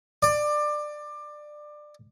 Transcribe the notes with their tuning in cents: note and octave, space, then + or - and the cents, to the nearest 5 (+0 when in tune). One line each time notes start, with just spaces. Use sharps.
D5 +20